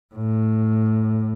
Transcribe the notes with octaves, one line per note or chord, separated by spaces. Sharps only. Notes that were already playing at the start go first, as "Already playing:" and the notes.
A2